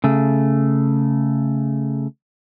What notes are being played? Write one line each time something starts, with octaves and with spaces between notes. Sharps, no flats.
C#3 A3